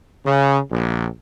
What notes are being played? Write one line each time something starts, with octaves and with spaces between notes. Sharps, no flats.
C#3
A#1